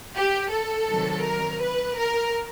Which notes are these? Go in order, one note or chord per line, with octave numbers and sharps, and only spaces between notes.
G4
A4
C3 D#3 F#3
A#4
B4
A#4